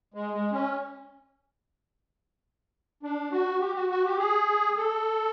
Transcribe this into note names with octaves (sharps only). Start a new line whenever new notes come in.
G#3
G#3
C#4
D4
F#4
G4
F#4
F#4
G4
G#4
A4